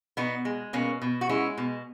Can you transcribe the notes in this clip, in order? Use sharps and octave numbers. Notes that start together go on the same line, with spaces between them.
B2 B3 D#4
G#3
B2 A#3 C#4
B2
F#4
G#3 C#4 E4
B2